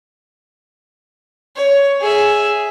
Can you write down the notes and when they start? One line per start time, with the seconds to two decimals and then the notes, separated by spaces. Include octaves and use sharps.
1.56 C#5
2.01 G#4 E5